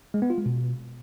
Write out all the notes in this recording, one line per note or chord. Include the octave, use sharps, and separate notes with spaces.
G#3
B3
F4
G#3
B2